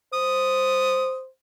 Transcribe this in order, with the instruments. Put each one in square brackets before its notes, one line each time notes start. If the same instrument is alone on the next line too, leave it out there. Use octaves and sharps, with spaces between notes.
[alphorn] C5 [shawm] D#6